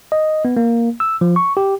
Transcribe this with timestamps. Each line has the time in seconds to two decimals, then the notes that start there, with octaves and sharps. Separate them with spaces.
0.12 D#5
0.45 B3
0.57 A#3
1.00 E6
1.21 F3
1.36 C#6
1.57 G4